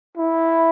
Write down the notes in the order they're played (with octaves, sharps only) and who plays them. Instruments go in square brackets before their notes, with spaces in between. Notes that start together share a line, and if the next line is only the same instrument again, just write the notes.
[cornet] E4